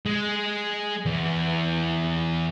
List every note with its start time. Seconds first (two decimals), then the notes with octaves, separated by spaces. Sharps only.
0.06 G#3
1.06 E2